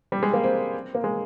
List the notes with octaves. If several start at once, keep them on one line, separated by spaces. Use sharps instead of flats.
G3
G#3
A#3
C4
A#3
G#3